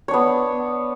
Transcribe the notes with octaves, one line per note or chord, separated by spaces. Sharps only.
B3 D4 C#5